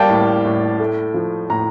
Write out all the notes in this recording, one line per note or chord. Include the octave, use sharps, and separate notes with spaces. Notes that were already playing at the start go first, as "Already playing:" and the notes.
Already playing: G3 A#3 D5 F5 G5 A5
A2
A2
A3
F3
A2 A#5